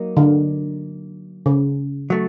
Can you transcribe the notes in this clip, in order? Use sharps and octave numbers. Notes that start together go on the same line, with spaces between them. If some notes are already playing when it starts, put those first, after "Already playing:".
Already playing: F#3 A#3 D#4
D3
C#3
F#3 A3